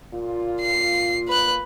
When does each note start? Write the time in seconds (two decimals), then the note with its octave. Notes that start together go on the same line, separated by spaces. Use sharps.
0.13 A#2 F4
0.62 C7
1.28 B4 F#6